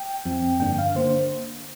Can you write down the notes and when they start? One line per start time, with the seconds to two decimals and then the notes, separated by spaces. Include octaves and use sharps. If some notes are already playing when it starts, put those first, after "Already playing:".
Already playing: G5
0.25 F2 F3 C4
0.60 G2 D3 A#3 D4 G5
0.78 F5
0.95 D3 A#3 D4 C5